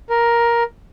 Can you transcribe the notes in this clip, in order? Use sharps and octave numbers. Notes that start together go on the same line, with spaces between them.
A#4